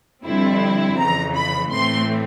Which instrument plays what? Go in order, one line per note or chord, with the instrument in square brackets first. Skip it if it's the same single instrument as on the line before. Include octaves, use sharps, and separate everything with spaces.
[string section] F2 D3 G3 C4 E4
F2 C#3 E3 A#5
B5
A2 E3 A3 C4 C6